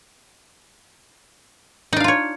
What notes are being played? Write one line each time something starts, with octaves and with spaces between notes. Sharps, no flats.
D4 D#4 F4 C#5 F5